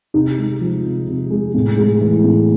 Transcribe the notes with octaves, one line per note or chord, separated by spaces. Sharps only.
C3 D#4
G#3
F3
C3
C3
G#3
A2
G#3
E3
A2